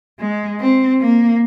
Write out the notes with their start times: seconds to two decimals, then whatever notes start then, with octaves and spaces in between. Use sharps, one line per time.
0.20 G#3
0.60 C4
1.01 A#3